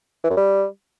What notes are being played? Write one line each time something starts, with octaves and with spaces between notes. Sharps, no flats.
E3
F#2
G3